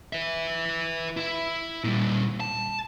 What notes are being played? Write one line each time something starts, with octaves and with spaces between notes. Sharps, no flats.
B4 E5
E4 E5
A#2 G3
A5